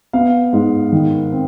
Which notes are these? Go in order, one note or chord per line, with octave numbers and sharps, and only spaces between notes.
B3 F5
G#2
D#3
C4